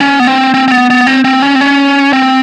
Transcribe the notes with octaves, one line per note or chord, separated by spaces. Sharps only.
C#4
B3
C4
C4
C4
B3
B3
C4
C4
C#4
C4
C#4
C4